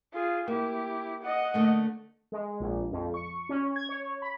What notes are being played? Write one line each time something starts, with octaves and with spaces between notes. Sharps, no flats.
F4 G#4
A#3 E4 G4
D#5 F#5
D3 A3 A#3
G#3
A#1
F2
C#6
C#4
G#6
C#5
B5